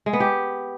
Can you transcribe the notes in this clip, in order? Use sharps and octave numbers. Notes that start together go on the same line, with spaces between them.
G#3
B3
G4